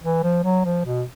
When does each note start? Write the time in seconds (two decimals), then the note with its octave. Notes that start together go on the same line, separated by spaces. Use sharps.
0.03 E3
0.23 F3
0.44 F#3
0.65 F3
0.85 B2